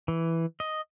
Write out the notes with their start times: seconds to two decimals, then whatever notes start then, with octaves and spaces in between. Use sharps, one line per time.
0.08 E3
0.60 D#5